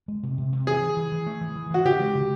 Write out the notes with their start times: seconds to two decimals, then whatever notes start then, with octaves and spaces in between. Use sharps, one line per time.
0.08 G#3
0.23 C3
0.38 C3
0.53 C3
0.67 E3 G#4
0.82 E3
0.97 E3
1.12 E3
1.27 A3
1.41 E3
1.56 E3
1.71 E3 F#4
1.85 C#3 G4
2.00 G#3
2.15 C#3